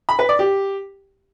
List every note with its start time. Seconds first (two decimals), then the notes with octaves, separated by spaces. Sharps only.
0.09 B5
0.19 B4
0.29 D5
0.39 G4